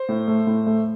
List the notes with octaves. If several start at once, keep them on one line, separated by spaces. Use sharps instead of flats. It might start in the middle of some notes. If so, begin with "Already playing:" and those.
Already playing: C5
A2
A3
A2
A3